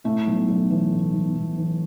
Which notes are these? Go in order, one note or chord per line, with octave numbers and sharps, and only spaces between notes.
A2 A3
B1
B1
E3
A2
B1
B1
E3